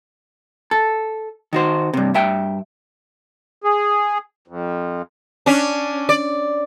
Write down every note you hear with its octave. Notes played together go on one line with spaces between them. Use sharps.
A4
D#3 F#4 C5
G2 C3
G2 E5 G5
G#4
F2
C#4 D4
D5